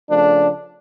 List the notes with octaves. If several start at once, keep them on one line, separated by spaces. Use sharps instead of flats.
C#3 F3 A3 D4